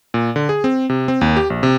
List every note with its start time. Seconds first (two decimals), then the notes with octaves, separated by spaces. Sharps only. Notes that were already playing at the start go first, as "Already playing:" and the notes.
0.14 A#2
0.36 D3
0.49 G#4
0.64 C4
0.90 C3
1.08 C4
1.21 D#2
1.36 G4
1.50 A#1
1.63 C3